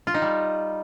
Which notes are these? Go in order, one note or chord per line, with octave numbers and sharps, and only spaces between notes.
F4
D#4
G3